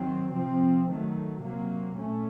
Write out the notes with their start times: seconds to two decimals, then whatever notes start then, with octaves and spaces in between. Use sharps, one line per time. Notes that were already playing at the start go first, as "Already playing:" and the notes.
Already playing: D#3 F#3 C4
0.33 C3 F3 C4
0.88 D#3 F#3 A3
1.41 C3 F#3 A#3
1.97 A#2 A3 C#4